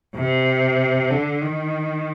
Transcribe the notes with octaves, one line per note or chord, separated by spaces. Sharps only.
C3
D3
D#3